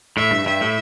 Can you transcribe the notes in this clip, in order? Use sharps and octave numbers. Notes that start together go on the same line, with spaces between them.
A2 E5
G2
G2 E5
A2